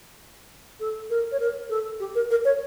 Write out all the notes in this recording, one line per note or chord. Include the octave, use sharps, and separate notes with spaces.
A4
A#4
C#5
A#4
A4
G4
A#4
A#4
C#5